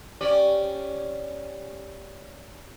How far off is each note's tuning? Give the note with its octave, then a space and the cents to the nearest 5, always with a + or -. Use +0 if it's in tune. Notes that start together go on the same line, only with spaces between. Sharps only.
C#4 +0 G4 +0 D5 +0